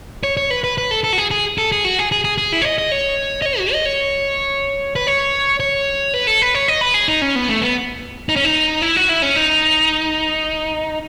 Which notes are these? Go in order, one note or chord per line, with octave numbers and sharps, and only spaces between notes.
C#5
C#5
B4
B4
B4
A4
A4
F#4
G#4
G#4
A4
G#4
F#4
G#4
G#4
G#4
G#4
E4
C#5
D#5
D#5
C#5
D#5
C#5
F#4
D#5
C#5
B4
C#5
C#5
B4
A4
B4
C#5
D#5
B4
G#4
D#4
C#4
B3
A3
B3
D#4
C#4
D#4
E4
F#4
E4
C#4
D#4